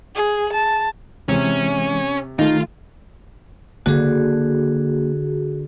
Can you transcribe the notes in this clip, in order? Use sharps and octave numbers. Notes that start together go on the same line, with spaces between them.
G#4
A5
C3 E3 G#3 C#4
D#3 A3 D#4 F4
D3 A#3 F#4 G#4